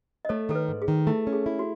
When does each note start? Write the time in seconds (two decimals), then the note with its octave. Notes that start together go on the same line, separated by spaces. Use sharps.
0.25 D#5
0.29 A3 A4 C#5
0.49 D#3 A4
0.55 B4
0.68 G#2
0.82 G#4
0.88 D#3
1.07 A3 E4
1.27 C#4
1.33 G#4
1.46 E4
1.59 F#4